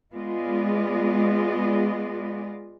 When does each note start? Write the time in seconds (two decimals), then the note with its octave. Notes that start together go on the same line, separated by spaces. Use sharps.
0.14 G#3 B3 F4 G#4 D5 D#5